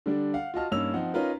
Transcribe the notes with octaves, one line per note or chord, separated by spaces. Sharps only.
D3 G3 D4
F5 F#5
F4 F#4 D#5 A5 F6
G2 A#3 C#4 D#4 E6 F7
F3 C4 D#4 F#5
C#4 D#4 F4 A#4 B4